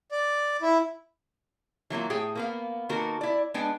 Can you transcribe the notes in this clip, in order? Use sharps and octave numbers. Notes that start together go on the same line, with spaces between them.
D5
E4
E3 F#3 A#3 F4
A2 G#4 G5
A#3 B3 F5
D#3 A#3 F#4 A4 A#4
E4 D5
G#3 B3 D4 B4 G5